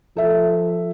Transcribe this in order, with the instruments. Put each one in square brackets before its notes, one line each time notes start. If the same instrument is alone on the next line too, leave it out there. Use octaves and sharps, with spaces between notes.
[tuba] F3 [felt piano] A4 E5